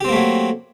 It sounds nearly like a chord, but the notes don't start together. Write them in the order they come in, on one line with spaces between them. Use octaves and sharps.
G4 C4 A#3 A3 F#3